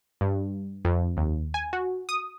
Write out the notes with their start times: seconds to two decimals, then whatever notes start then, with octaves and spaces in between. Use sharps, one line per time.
0.21 G2
0.85 F2
1.17 D#2
1.54 G#5
1.73 F#4
2.09 D#6